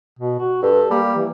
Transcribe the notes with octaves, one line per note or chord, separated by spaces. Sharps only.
B2
F#4
G2 A4
G3 A#3
E3